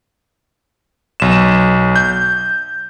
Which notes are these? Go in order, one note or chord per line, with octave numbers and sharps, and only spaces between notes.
B1 E7
G6